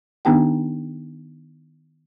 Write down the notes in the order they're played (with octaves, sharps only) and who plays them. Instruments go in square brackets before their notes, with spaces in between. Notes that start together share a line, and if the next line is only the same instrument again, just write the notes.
[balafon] D#3 B3 D4 D#4 G4 G5